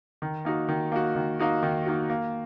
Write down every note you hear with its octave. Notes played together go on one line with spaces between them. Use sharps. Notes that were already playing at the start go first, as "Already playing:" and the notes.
D#3
A#3 D#4 F#4
D#3
A#3 D#4 F#4
D#3
A#3 D#4 F#4
D#3
A#3 D#4 F#4
A#3